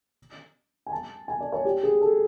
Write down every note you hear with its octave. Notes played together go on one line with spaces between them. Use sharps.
G#5
A5
G#5
D5
C#5
G4
G#4
A4